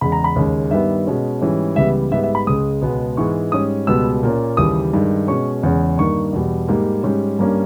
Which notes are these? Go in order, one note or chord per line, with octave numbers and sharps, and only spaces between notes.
E2 C#3 G#3 B5
A#5
B5
D#2 C#3 G#3 C#4
G2 D#3 G3 B3 E5
B2 G#3 C#4
G#2 E3 G3 C#4
C#2 C#3 E3 G3 B3 E5
G#2 G3 B3 E5
E5
B5
C#2 C#3 G#3 D#6
C#2 B2 G#3 B3
G#2 E3 G#3 B3 C#6
G#2 G3 C#4 D#6
C#2 B2 G3 B3 E6
A#2 A#3 C#4
D#2 C#3 E3 G3 D#6
G2 D#3 G#3
B2 G#3 C#4 C#6
E2 C#3 G#3 C#4
G2 D#3 A#3 C#6
E2 B2 G3
G#2 G3 A#3
G#2 G3 C#4
G2 G3 A#3 C#4